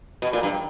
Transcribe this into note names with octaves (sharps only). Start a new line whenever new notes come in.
B2
A#2
G2